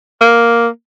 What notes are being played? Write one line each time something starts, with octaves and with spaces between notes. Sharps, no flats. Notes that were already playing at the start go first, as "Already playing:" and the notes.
A#3